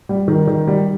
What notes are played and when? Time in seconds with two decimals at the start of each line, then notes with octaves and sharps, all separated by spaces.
0.09 G3
0.28 D#3
0.47 D#3
0.67 G3